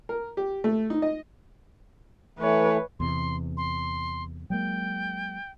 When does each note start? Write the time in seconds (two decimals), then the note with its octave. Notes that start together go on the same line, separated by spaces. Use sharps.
0.09 A#4
0.37 G4
0.64 A3
0.90 D#4
1.02 D#5
2.39 E3 A3 B4 C#5
3.00 E2 C3 E3 C6
3.57 C6
4.50 F#3 G#3 A#3 G5